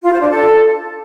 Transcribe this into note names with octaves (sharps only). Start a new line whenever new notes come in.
F4
C5
D4
A4